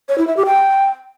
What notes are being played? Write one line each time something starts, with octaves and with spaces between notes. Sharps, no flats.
C#5
E4
E5
G4
G5